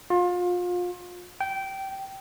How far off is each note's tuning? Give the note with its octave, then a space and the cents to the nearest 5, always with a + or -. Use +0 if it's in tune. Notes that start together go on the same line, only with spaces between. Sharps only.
F4 +30
G5 -15